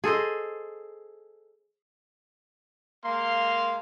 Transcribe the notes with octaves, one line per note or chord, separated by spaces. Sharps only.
G#4 A4 C5 D#5
G#3 A#3 F5 C6